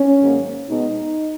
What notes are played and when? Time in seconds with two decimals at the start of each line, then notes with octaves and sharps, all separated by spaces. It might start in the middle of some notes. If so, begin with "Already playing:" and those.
Already playing: C#4
0.21 G#2 D#3 F#3 A#3
0.68 B2 G#3 B3 D#4